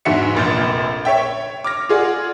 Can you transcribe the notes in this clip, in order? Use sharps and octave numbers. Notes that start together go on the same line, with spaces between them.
E2 G#2 D4 F#4 E5 C#7
F1 A#1 A#2 G6
C#5 E5 G5
C#5
D6 F6 A#6
F4 G#4 D5 F#5